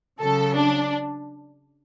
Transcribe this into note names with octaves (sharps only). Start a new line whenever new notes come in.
C#3 F#3 A4
D4